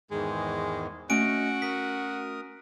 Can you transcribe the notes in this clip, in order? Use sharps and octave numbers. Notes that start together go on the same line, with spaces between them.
E2 G#2 D#3 G#3
A3 C#4 F#4 D#5 G#5 D7
A#4 D#6 B6